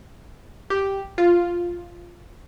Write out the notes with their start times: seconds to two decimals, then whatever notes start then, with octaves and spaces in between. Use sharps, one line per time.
0.70 G4
1.18 F4